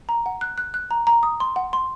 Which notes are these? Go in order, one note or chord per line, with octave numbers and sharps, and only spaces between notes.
A#5
F#5
F#6
F#6
F#6
A#5
A#5
D#6
C6
F#5
C6